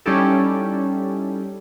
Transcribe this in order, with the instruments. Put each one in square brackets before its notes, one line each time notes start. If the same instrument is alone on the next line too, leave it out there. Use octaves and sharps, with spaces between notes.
[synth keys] G3 C#4 D#4 E4 G4 A4